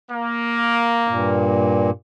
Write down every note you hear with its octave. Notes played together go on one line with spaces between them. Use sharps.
A#3
G2 A#2